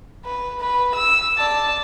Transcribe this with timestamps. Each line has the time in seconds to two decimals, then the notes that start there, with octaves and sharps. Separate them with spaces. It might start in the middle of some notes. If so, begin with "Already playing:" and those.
0.25 B4
0.60 B4
0.95 E6
1.38 D5 A5